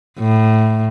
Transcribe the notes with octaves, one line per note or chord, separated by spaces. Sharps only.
A2